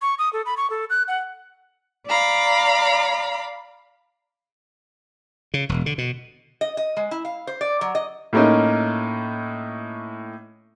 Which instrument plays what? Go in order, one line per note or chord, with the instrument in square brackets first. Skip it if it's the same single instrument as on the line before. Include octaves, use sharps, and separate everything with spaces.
[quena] C#6
D#6
A4
B5
C#6
A4
F#6
F#5
[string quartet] D5 F5 A#5 B5
[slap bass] C#3
E1
D3
B2
[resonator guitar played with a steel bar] D#5
D#5
G#3
E4
F5
C5
D5
F#3
D#5
[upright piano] A2 A3 A#3 C#4 D#4